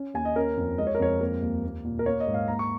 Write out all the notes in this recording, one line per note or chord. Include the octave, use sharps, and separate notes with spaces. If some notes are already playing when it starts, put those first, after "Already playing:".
Already playing: C#4
D#2 G#5
D#5
C#4 A#4
F2
G#3 D#5
C#5
A#4
F2 C#5
A#3 A#4
D#2
A#3
A#2
A#4
A#3 C#5
D#5
G#2
F5
A#3 A#5
C#6